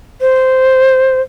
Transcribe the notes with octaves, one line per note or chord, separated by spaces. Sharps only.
C5